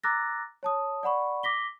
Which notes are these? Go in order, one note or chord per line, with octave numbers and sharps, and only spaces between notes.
A#5 D6 E6 F#6 A6 A#6
C#5 A5 D#6
D5 F#5 B5 C#6
D6 A#6 B6 G7